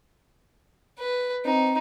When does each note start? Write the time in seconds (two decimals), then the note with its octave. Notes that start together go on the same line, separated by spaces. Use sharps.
0.99 B4
1.45 C4 D#4